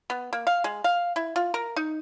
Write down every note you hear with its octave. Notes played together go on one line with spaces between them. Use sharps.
B3
A#3
F5
G#3
F5
E4
F4
A#4
D#4